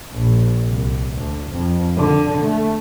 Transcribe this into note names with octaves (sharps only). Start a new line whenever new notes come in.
A#1
C2
D2
F2
D3
A3